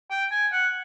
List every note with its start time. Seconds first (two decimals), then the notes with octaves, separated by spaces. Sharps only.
0.11 G5
0.31 G#5
0.53 F#5